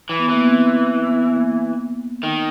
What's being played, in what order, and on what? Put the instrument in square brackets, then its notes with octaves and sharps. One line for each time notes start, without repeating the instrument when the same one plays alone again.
[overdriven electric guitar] E3
[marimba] B3
[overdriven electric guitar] E3 [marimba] A#3
[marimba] B3
C4
B3
A#3
[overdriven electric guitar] D#3